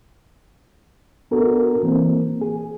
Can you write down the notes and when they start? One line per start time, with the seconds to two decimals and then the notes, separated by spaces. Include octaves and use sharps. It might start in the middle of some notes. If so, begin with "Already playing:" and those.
1.31 B3 D4 F#4 A4 A#4
1.83 E3 A#3 C4
2.41 G#4